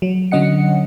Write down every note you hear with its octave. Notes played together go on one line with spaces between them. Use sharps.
F#3
D3 F#3 C#4 D#5 F#5 C#7